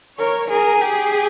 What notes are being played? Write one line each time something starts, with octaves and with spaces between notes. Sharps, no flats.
A#4 C#5
G#4 A#4
G4 G#4